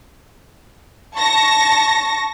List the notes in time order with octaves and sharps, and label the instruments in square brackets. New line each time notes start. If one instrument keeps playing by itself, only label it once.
[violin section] A5 C#6 A#6